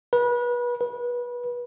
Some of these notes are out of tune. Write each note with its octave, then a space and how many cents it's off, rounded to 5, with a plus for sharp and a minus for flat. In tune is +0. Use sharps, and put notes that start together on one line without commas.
B4 -30
B4 -25